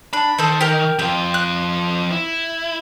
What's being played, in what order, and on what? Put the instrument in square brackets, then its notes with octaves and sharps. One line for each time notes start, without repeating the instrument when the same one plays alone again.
[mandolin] D4 [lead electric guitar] B5
[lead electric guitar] D#3 [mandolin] A4 C5
[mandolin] G4 A#4
[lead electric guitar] F2 F4 [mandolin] G5
[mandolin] F#6
[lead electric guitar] E4